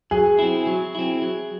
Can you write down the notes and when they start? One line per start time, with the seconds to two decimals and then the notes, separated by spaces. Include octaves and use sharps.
0.11 F#3 G#4
0.39 C4 E4
0.67 F#3
0.95 C4 E4
1.22 F#3